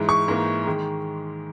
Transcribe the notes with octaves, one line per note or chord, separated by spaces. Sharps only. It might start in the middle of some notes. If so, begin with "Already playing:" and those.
Already playing: G#2 E3 G#3
C#6
G#2 E3 A#3
D#3 G#3